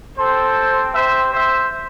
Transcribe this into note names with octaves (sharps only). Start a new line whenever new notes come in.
C4 G4 A4 C5
C5 E5
C5 E5